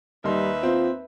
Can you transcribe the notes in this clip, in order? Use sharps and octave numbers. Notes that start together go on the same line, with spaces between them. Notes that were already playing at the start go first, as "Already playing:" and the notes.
D#2 G3 D#4 B4 E5 C6
C4 F4